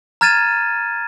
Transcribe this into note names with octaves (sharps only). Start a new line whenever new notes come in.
A#5 F6 G#6 A6 D#7 E7